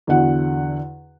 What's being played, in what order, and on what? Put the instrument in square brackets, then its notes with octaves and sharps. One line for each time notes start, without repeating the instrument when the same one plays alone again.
[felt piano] E2 D3 F#4 F#5